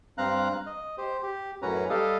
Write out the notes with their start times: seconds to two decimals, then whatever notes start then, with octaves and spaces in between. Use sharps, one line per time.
0.18 G2 C4 F5 A#5 F#6
0.66 D#5
0.98 G4 C5
1.23 G4
1.62 F#2 A2 C#4 F#4 B4 A#5
1.90 G3 G4 A4 D#5 F5